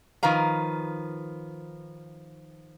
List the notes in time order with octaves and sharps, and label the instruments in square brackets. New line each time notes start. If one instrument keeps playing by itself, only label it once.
[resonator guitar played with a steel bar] D#3 F3 B4 F5 A#5